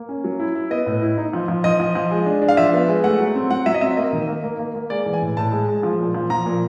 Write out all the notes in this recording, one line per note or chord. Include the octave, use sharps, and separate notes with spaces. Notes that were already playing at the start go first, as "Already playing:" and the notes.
Already playing: A#3
C#4
F#3
E4
E4
B3 D#5
A2
E4
D#4
F3
F3
F3 D#5
F3
F3
G#3
D4
D4
F5
F3 E5
B3
G#3
A3 F#5
F#3
C4
F#3 F#5
F#3 E5
D#5
C4 E5
A#3 D#5
D#3
A#3
A#3
A#3
A#3
G#3 D5
E3
G#5
A2
A2 A5
G#3
G#3
F3
A#2
F3
F3 A#5
A#2